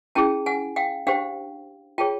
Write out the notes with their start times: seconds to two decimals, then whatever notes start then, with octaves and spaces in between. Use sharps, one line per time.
0.15 C#4 E4 G#4 G5 A5
0.46 F#5 G#5
0.76 F5 G5
1.07 D4 G4 C5 F5 G5
1.98 F4 G#4 C#5 G5 A5